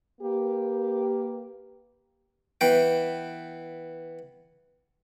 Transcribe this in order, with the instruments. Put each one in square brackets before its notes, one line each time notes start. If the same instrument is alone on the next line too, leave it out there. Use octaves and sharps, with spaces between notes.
[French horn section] A#3 G4 B4
[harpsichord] E3 B3 G5